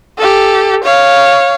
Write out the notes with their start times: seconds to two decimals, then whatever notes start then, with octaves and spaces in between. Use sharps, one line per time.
0.18 G4 A4
0.84 C#5 F5